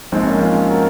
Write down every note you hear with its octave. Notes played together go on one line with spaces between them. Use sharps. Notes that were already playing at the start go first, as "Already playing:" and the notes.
A#1 G#2 F3 G#3 C4
A#3 C#4
C#4 F4
F#4 A#4